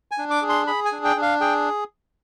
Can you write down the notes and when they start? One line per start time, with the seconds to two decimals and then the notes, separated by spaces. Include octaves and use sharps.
0.11 G#5
0.18 D4
0.31 D6
0.42 G#4
0.49 C6
0.67 G#4 B5
0.85 G#5
0.92 D4
1.05 G5
1.16 D4
1.22 F5
1.41 G#4 G5